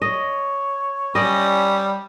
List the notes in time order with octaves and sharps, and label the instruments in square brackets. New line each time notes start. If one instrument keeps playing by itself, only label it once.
[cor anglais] C#5 [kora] D#5
[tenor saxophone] G3 [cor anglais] C#4 [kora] D5 D#5